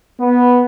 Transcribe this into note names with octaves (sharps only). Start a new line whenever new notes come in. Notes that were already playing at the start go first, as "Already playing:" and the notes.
B3